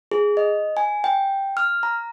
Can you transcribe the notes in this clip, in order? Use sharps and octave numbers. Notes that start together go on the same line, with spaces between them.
G#4
D#5
G#5
G5
F6
A#5